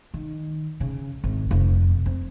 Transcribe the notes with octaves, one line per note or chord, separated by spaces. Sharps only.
D#3
C#3
G#1
F1
C4